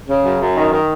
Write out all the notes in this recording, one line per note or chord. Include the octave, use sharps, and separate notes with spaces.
C#3
F#2
F#2
D#3
D#3